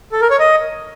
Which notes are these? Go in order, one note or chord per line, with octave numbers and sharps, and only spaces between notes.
A4
A#4
C#5
D#5